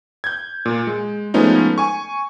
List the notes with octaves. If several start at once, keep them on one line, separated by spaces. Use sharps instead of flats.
G6 G#6
A#2
G#3
F3 G#3 A3 B3 C#4 D#4
G#5 C#6